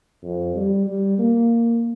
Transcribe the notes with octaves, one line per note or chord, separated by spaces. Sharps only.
F2
G3
G3
A#3